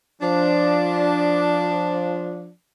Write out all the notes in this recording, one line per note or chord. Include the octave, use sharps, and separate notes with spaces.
F3 D4